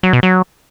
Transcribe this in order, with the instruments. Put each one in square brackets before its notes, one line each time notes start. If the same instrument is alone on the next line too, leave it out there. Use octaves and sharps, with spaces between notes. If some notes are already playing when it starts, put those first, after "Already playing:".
[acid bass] F#3
B2
F#3